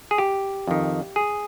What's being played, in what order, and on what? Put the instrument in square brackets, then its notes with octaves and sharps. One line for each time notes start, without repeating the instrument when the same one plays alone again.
[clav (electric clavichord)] G#4
G4
F2 D#3
G#4